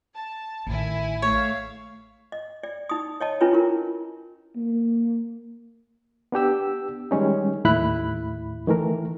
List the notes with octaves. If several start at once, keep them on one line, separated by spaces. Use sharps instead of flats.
A5
A1 D#3 E4 G#5
A3 C#5 E5 F5
D#5
D5
D#4 D#6
C#5 D#5 A5
C#4 D4 E4 F4 B4 C#5
E4 F4 A#4
A#3
B3 D4 G4 E6
D#3 G3 G#3 C#4 D#4
D#2 A2 E4 B5 F#6
D#3 E3 A3 A#4